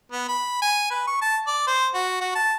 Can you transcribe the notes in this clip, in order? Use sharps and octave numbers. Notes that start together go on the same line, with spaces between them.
B3
B5
G#5
B4
C#6
A5
D5
C5
F#4
F#4
A5